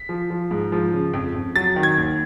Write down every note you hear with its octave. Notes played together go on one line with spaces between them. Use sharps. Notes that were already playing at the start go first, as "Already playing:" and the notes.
Already playing: B6
F3
F3
G#2
F3
C#3
F2
F2
F#3 A6
D#3
G#6
D#2